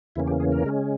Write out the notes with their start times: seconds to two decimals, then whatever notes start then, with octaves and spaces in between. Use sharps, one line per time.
0.16 E2 C#3 E3 A#3 C#4 E4
0.27 G4
0.40 G#4
0.52 A#4
0.64 C#3 G#3 C#4